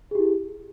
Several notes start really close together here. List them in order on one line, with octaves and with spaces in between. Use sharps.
G#4 G4 E4